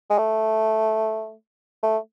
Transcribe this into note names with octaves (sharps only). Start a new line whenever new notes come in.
G#3
A3
A3